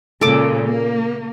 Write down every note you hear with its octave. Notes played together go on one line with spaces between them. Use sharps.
A#2 C#3 G#3 A4 D6
A#3